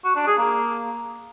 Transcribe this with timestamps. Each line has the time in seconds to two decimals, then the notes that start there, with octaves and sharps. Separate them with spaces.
0.05 F#4
0.16 D4
0.27 G#4
0.38 A#3